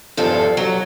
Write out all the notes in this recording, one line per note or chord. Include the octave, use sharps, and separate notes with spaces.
E2 G2 F3 A4
F#3